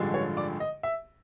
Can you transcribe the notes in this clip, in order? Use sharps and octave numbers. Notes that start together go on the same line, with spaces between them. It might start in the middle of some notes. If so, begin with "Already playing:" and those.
Already playing: A1 G2 D3 F3 G#3
C#5
D5
D#5
E5